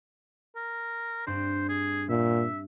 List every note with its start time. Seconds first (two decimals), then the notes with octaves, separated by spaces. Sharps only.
0.56 A#4
1.27 G2 C4 D4 C5
1.69 G#4
2.09 A#2 E5